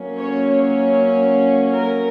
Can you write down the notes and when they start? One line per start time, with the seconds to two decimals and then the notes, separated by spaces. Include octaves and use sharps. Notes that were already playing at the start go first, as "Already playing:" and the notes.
Already playing: F#3 A#3 C#4
0.18 C#5
0.49 C#5
1.72 A#4